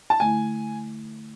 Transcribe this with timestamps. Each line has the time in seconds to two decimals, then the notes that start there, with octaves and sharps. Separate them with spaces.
0.10 A5
0.20 D3 A3 E4 G#5